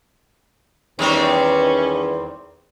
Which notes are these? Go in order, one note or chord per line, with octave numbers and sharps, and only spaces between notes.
E2 D#3 G3 C4 C#4